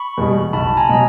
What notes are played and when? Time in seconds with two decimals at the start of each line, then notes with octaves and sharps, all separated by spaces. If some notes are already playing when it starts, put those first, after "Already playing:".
Already playing: B5 C#6
0.17 E2 B2 G3
0.53 B1 A5 B5
0.77 G#5 A#5
0.89 B2 F#3 A#5